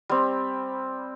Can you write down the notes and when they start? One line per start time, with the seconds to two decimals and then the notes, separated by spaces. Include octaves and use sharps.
0.09 G3 C4